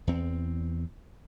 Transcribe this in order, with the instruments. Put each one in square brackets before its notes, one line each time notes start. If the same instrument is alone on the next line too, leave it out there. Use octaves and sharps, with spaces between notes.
[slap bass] E2 C4